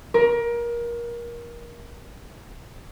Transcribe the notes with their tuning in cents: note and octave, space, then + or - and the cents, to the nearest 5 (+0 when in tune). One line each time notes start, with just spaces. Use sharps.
A#4 +25